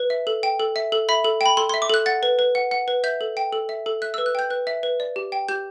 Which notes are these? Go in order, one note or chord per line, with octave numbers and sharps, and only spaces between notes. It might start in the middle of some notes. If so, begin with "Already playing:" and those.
Already playing: B4
E5
A4
G5
A4
E5
A4
E5 B5
A4
G5 B5
A4 C6
C6
E5
D6
A4 F#6
F#5 A6
B4
B4
F#5
F#5
B4
E5 G6
A4
G5
A4
E5
A4
E5 F#6
E6
B4
F#6
G5 G6
B4 F#6
E5
B4
D5
G4
G5
G4 G6